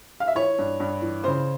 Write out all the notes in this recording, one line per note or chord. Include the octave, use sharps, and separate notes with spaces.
F5
E5
E3 C#5
G2
G2
E3
C#3 C5